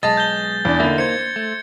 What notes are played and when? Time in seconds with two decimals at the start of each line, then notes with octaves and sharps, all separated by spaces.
0.03 B1 G#3 D#5 A5 A6
0.17 G6 G7
0.65 E2 D4
0.80 D3 A#3 D#4 E4
0.98 C5 G#6 C#7
1.36 A3